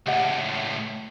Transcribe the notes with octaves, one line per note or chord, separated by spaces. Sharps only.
C#2 A2 G4 D#5 F#5